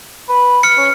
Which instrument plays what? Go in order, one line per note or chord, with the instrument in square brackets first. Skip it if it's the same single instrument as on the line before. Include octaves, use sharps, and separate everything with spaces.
[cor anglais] B4
[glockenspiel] F6 C#7
[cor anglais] C#4